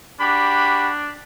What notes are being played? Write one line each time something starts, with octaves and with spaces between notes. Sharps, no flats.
D4 F#4 G4 B5